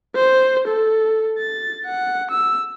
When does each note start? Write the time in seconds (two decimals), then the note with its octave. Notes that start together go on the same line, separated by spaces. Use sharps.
0.15 C5
0.67 A4
1.38 A6
1.86 F#5
2.31 E6